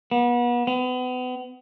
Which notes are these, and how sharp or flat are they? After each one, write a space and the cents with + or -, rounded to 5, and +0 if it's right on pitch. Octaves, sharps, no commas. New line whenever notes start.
B3 -35
B3 +35